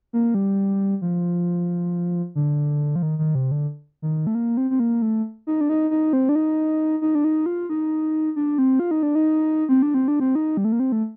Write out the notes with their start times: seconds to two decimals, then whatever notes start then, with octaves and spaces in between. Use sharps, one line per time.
0.13 A#3
0.35 G3
1.02 F3
2.35 D3
2.96 F3
3.03 D#3
3.19 D#3
3.35 C3
3.51 D3
4.02 D#3
4.27 A3
4.35 A#3
4.57 C4
4.70 C4
4.80 A#3
5.02 A3
5.47 D#4
5.61 D4
5.69 D#4
5.91 D#4
6.13 C4
6.29 D4
6.35 D#4
7.02 D#4
7.15 D4
7.24 D#4
7.46 F4
7.69 D#4
8.36 D4
8.58 C4
8.80 F4
8.91 D#4
9.03 D4
9.15 D#4
9.69 C4
9.82 D4
9.94 C4
10.08 D4
10.20 C4
10.35 D#4
10.57 G3
10.65 A3
10.72 A#3
10.80 C4
10.92 A3